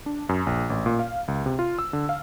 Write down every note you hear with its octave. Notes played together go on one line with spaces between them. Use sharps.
D4
F#2
A#1
A1
A#2
F5
C#2
C3
F4
E6
D3
F5